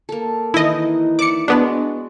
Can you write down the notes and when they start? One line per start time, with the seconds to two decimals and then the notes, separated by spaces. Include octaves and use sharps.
0.09 A#3 A4
0.54 D#3 E3 D#4 E4 D#5
1.19 D5 E5 D6 C#7
1.48 G#3 B3 D4 F#4 D5